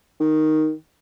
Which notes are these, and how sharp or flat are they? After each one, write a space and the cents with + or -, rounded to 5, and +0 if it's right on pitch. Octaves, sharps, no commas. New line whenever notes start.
D#3 +0